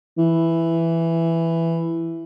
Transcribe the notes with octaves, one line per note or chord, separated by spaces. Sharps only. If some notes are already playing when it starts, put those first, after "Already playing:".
E3